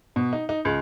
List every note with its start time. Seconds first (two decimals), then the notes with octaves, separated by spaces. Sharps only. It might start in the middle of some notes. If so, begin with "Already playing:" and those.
0.16 B2
0.33 D#4
0.49 D#4
0.65 C#2